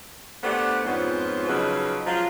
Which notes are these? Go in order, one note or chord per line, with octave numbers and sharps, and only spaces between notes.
A3 B3 D4 G4 C5 F#5
F2 G#2 B3 C#4 F4 C5
C#3 F3 F#3 D#4 B4 D#5
F3 F#3 G#3 F4